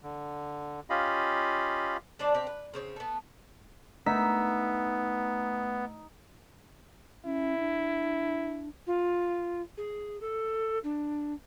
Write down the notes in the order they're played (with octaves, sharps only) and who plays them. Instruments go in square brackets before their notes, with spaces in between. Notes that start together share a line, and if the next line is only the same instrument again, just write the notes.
[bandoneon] D3
C#4 F4 G4 D#5 F5 B5
[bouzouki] G3 D4 C5 D5
C4 G4
B4
C#3 C4 C#5
A3 B3
[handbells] A3 E6 B6 [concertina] B3 [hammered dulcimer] D#4
[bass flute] C#4 [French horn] E4
[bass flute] D4
[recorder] F4
G#4
A4
D4